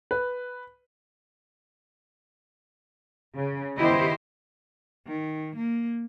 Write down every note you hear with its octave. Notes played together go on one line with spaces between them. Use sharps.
B4
C#3
D#3 B3 E4 G4 C5 D#5
D#3
A#3